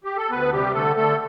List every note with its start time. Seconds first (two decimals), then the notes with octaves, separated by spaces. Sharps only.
0.04 G4
0.17 A4
0.30 D2 B3 B4
0.52 C3 G3 G4
0.74 D3 A3 A4
0.96 D3 A3 A4